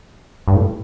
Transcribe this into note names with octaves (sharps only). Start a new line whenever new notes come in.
G2
A2